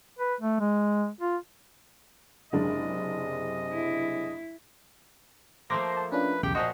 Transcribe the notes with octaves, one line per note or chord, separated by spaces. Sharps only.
B4
A3
G#3
F4
F#1 C3 G#3 D4 G#4 D#5
E4
F3 A3 A#3 C5 C6 D6 A#6
A5
C#4 D4 F4 B4
B1 E2 C#3 G4 G5
A#2 F3 F#4 D#5 C6